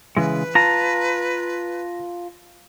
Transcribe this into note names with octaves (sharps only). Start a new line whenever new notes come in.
C#3 E3 G#3 B4
F4 A5 A#5 A#6